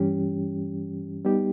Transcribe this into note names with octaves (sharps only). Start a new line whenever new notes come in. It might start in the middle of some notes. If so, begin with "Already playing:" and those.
Already playing: G2 E3 G3 C#4 G4
G3 B3 D#4 G4